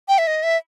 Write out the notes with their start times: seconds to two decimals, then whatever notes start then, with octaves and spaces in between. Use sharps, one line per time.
0.08 G5
0.18 E5
0.27 D#5
0.43 E5